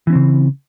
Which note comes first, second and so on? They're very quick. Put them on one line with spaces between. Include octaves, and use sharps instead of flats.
E3 C#4 C4 C#3